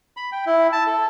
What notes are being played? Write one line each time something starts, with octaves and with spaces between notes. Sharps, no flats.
B5
G5
E4
A5
A4